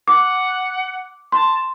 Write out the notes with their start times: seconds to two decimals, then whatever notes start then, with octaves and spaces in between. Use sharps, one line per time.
0.08 F#5 D6
1.32 A5 C6